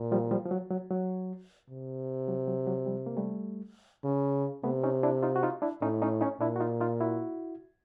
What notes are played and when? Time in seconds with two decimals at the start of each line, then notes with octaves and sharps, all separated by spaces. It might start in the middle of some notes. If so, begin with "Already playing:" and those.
Already playing: A#2
0.12 F3 G3
0.31 F3 G3
0.45 F3
0.51 F#3
0.71 F#3
0.91 F#3
1.70 C3
2.28 F#3
2.48 F#3
2.67 F#3
2.87 F3 G3
3.06 A#3
3.17 G3 A3
4.05 C#3
4.64 C3 A3 B3
4.84 C#4 D#4
5.03 D4 E4
5.23 D#4 F4
5.36 F#4
5.43 D#4 F4
5.62 D4 E4
5.82 A2 C#4 D#4
6.02 C#4 D#4
6.21 C#4 D#4
6.40 A#2 D4 E4
6.56 F#4
6.60 D#4 F4
6.81 D#4 F4
7.01 E4 F#4